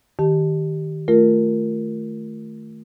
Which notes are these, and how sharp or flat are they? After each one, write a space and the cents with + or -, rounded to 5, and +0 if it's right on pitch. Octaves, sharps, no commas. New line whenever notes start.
D#3 +0 G4 -10 A5 +0
A3 +0 F4 +0 A#4 +0